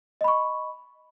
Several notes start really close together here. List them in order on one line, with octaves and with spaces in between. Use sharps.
D#5 B5 C#6